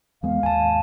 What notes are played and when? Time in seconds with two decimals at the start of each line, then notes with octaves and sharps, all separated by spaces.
0.23 E2 G#3 B3 F5
0.43 D#2 G#2 G#5 A5